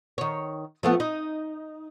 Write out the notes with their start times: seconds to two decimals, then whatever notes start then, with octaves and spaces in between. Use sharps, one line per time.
0.18 D#3 C#5
0.83 F3 A3 B3
1.00 D#4